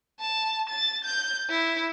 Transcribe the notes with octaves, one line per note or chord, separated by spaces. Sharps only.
A5
A6
G6
E4